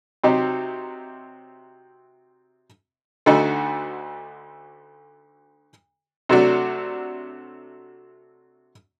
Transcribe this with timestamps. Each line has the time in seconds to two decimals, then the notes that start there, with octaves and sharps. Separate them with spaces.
0.23 C3 F#3 C4 D#4 G4
3.26 D2 D3 A3 D#4 F#4
6.29 C3 F#3 A3 D4 F#4